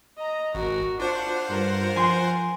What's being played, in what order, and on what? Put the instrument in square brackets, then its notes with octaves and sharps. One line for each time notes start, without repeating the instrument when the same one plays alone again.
[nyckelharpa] D#5 A#5
[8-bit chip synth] G#1 [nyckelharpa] F#4 A#4
[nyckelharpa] D4 [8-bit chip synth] F4 C5 F#5
[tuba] G2 [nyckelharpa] A#4
[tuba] F3 [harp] G#5 C6